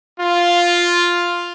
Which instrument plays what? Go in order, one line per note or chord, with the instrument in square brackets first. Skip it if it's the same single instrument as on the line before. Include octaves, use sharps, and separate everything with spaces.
[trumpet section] F4